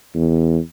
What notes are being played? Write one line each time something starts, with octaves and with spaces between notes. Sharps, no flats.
E2